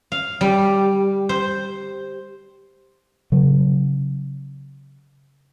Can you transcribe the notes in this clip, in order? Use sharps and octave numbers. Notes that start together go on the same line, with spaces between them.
F5
G3
C5
C#3 F#3